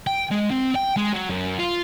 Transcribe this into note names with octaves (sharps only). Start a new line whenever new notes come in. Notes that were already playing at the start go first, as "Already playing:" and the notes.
G5
G#3
C4
G5
G#3
F#3
F#2
F4